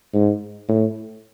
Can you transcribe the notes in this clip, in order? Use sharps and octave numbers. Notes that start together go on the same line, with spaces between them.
G#2
A2